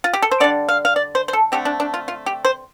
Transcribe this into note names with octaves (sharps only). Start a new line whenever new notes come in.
F4
G4
A4
C5
D3 G3 D4 D5
F5
F5
D5
C5
C5
A4
D3 A3 C4 G4
D4
D4
F4
F4
G4
C5